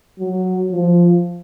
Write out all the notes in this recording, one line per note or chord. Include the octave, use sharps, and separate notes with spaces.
F#3
F3